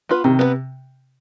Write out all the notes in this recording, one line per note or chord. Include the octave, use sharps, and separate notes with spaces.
B3 F4 B4
C3 D#3
B3 F4 B4